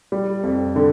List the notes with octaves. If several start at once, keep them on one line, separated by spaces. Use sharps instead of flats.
G3
F2
D3